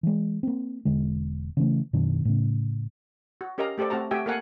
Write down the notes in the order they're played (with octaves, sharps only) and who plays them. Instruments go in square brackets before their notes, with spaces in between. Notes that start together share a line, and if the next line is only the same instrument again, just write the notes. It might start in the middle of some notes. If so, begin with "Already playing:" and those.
[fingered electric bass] E3 G#3
A#3 C4
E1 D3 G#3
C#3 E3 A3
F#2 B2 D#3 D4
A2 C#3
[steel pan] F#4
C#4 G4 A#4 D#5 F5 A#5
A3 G4 A4 C5 D5
A3 C4 F#4 A5 A#5
A3 F#4 G4 E5 G5 G#5
A#3 A4 A#4 F5 F#5 G#5